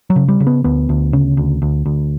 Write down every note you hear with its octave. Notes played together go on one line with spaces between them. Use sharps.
F#3
C#3
G3
C#3
B3
D2 B3
D2
C#3
D2
D2
D2